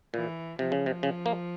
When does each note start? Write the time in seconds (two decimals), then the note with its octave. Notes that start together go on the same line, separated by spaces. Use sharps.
0.14 A#2 E3
0.59 C3 F3
0.72 C#3
0.86 C3
1.03 C#3
1.26 A#3